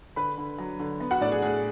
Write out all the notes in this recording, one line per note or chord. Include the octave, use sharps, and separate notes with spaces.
D3 B4 B5
D3
F#3
D3
B3
F#4 F#5
A2 D4 D5
G#4
A2 G#4